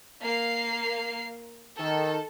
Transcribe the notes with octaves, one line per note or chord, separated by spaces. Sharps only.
A#3 F5 C7
D#3 A4